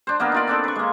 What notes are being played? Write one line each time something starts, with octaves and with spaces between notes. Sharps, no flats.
D4 C5
A#3 B3 D4 A#4
D#4 F4 D5
C4 D4 A4
B4 C#6
G#3 A#3